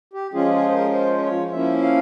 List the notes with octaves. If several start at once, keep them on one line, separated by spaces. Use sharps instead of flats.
G4
F3 G#3 C#4 F4 G#4
G#4
C5
A#4
C5
C5
C#5
F3 A#3 C#4 E4 E5
F5